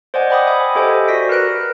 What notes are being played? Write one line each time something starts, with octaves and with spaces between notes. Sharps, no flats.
C5 D5 D#5 F#5 G#5
F#5 G5 B5 D6 D#6
E5 G#5 B5 D#6
G4 A4 C5 D#5 E5 G#5
F#4 D5 A#6 B6 D7
A#4 B4 F#6 D7